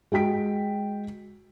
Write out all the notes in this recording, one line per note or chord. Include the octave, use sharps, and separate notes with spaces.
G#3 F#4 G5 B6 D7